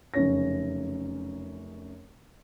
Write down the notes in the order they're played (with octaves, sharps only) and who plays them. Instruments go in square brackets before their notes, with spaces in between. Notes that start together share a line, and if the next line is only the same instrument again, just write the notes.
[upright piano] F1 F#2 C#3 C#4 C#5 A#6